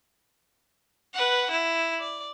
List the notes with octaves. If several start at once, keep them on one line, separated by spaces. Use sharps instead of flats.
B4 F#5
E4
D5